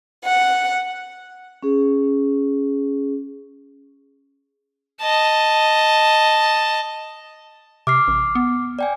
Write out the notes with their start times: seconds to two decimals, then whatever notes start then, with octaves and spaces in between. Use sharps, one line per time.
0.24 F#5
1.63 C#4 G#4
5.01 D#5 A5
7.87 C3 D6 F6 C7
8.08 A1
8.35 B3
8.79 D5 G5 G#5